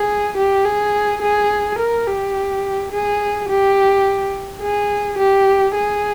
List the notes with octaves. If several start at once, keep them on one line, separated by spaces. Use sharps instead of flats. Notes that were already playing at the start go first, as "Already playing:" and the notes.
Already playing: G#4
G4
G#4
G#4
A#4
G4
G#4
G4
G#4
G4
G#4